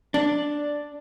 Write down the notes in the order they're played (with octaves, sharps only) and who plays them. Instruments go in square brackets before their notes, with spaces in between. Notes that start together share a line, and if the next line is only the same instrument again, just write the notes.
[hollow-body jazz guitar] D4